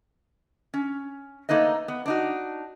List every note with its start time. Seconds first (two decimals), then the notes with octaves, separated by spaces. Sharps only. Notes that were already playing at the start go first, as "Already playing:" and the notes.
0.74 C#4
1.49 A3 A#3 D#4 B4 D#5
1.88 B3
2.06 D4 D#4 F#4